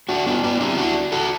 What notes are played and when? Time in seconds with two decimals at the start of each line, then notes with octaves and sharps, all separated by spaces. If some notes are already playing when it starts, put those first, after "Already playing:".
0.09 D4 F#4
0.26 B3 D4
0.44 B3 D4
0.61 C4 E4
0.77 D4 F#4
1.12 F#4 A4